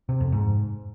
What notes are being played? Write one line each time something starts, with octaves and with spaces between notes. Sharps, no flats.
C3
F2
G#2